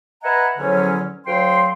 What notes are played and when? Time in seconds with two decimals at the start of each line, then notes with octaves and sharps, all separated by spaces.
0.23 B4 D#5 E5 F#5 G#5 A#5
0.58 E2 D3 F3 F#3 C#4
1.26 D2 F#3 F5 G5 C6